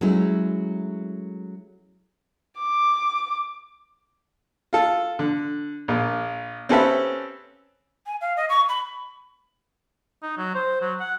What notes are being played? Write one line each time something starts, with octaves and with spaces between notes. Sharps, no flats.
F#3 G#3 A3 C#4 E4
D6
F4 A4
D3
A#1 A#2
C4 C#4 G4 A4 B4 E5
G#5
F5
D#5
C#6
B5
D#4
F#3
C5
F#3
F#5